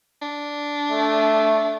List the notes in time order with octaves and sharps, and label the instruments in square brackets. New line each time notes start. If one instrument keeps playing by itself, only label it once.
[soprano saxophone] D4
[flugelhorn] A3